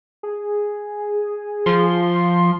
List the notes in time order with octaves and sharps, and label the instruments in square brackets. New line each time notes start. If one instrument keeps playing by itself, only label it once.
[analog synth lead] G#4
[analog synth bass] F3 [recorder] C6